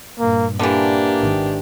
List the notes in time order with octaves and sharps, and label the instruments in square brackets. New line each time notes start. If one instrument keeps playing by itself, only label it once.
[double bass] G2 A#2 [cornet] A#3
[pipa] D3 E3 [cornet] A#3 [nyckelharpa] D4 G4
[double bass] G#1 D#3